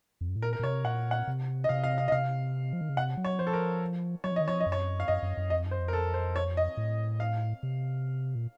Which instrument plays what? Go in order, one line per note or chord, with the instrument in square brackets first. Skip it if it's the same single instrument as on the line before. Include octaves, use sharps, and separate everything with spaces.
[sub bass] F2
F#2
A2
[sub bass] A#2 [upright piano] A#4
[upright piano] A#4
[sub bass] A#2
[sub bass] C3 [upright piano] C#5
[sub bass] A#2 [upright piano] F#5
[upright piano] F#5
[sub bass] C3
[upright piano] D#5
[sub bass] C3 [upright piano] F5
[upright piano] F5
F5
D#5
[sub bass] C3 [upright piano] F5
[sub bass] F3
D#3
C#3
[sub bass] C3 [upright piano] F#5
[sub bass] F#3
[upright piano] C#5
[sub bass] F3 [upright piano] C5
[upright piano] A4
A#4
[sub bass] F#3 [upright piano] C#5
[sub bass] F3
[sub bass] D#3 [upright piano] D#5
[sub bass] F3 [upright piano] C#5
[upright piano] D#5
[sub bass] F#2
[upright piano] C#5
F5
[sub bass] F#2 [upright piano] D#5
[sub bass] F#2
F#2
[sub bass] F2 [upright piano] D#5
[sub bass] F#2
[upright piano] C5
[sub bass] F2
[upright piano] A#4
A4
C5
C#5
D#5
[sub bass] A2
[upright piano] F5
[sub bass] C3
A#2